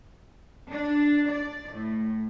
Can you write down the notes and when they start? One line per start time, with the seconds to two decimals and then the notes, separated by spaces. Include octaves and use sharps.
0.70 D4
1.31 D5
1.71 A2